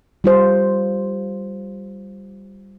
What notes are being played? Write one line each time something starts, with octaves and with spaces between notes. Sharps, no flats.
G3 F4 C5